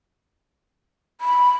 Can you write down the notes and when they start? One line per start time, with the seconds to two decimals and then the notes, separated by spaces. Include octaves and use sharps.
1.21 B5